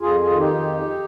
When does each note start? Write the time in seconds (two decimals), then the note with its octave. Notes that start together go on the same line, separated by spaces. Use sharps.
0.01 F2 F4 G#4
0.20 F4 G#4
0.30 D#3
0.39 D#4 G4
0.58 F2